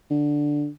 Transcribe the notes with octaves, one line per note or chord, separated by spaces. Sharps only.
D3